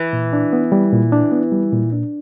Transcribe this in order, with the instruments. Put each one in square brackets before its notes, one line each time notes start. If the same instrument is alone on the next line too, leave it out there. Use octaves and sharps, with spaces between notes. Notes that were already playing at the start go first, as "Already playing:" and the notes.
Already playing: [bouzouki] E3
[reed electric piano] A#2
D4
B3
G3
A#2
D4
B3
G3
A#2
D4